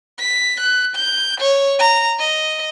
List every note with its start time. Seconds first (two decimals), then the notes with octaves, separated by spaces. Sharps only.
0.19 B6
0.60 F#6
0.96 G6
1.40 C#5
1.79 A#5
2.19 D#5